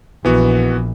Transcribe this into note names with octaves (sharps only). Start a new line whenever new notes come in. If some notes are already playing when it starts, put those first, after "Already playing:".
A#1 E3 B3 F#4